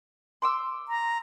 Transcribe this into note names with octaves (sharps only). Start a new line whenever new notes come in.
C6 D6 E6
A#5